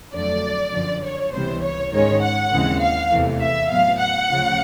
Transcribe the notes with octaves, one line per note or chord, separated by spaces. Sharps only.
F2 D3 F#3 A3 D5
F#2 D3 F3
C#5
C#2 C3 E3 G3 B3 C5
C#5
G#2 D#3 G#3 C#4 C#5
F#5
D#2 C#3 E3 G#3 C4
F5
E2 C3 E3 A3
E5
A2 F#3 B3 F5
F#5
D2 C#3 F3